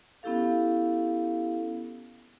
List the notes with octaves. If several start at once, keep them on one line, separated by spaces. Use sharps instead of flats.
B3 C#4 E4 G4 A4 F5